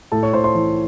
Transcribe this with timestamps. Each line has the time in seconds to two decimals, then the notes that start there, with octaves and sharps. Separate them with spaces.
0.12 A2 A4 A5
0.23 C#5 C#6
0.33 A2 C5 C6
0.44 C5 C6
0.55 E3